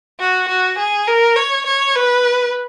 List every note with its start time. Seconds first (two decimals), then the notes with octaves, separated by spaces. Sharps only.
0.20 F#4
0.49 F#4
0.79 G#4
1.07 A#4
1.36 C#5
1.66 C#5
1.95 B4